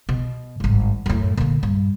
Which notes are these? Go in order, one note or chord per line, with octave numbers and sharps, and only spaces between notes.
B2
G#1 G2
F#2 A2
A#2 D3
G2